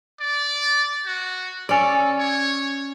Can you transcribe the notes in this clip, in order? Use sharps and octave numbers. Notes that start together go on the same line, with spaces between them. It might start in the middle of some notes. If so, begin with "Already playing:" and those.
D5
F#4
C#4 A4 D5
C#5